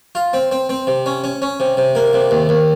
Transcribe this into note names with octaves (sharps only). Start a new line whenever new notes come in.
F4
C4
C4
C4
C3
C#4
C#4
C#4
C3
C3
A#3
C3
D#2
D#2